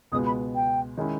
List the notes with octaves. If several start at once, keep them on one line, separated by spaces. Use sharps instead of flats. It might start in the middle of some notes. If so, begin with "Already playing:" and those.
C#2 B2 G#3 B3 D#6
B5
G5
D#3 G#3 C#4 E4